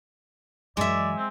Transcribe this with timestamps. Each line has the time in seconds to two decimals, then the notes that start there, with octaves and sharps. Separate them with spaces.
0.77 F#2 E3 G#3 D5 E5
1.17 C4